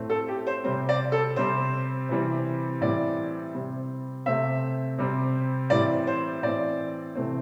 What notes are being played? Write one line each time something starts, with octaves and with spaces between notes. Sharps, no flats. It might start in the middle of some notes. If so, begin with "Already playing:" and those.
Already playing: A2 A3 C4
A4
G4
C5
C3 G3 C4 C5
D5
A4
C3 G3 C4 C5
C3 E3 G3 C4
A2 E3 G3 C4 D5
C3 G3 C4
C3 A3 C4 E5
C3 G3 C4
A2 E3 G3 C4 D5
C5
A2 E3 C4 D5
C3 E3 A3 C4